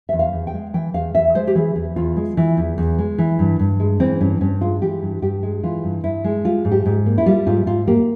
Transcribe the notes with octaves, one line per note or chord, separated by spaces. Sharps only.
E2 E5
F5
E2
G5
G#3
E3 G5
E2 F5
E2 E5
G#3 C5
G4
E3 G#4
E2
E2 F4
G#3
E3
E2
E2
G#3
E3
G2
G2
G#3
E3 C4
G2 C#4
G2 C#4
G#3 F4
E3 G4
G2
G2 G4
G#3
E3 F4
G2
G2 E4
G#3
G3 F4
G#2
G4
G#2
A#3
E4
G3 F4
G#2 F4
G#2 F4
A#3 G4